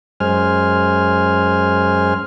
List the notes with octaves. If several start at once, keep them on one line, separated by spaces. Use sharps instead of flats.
F#2 G#3 C5 G#5 F6